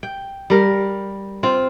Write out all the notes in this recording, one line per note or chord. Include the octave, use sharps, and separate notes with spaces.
G5
G3 A#4
C4 F4